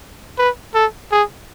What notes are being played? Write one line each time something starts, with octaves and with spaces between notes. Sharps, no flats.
B4
A4
G#4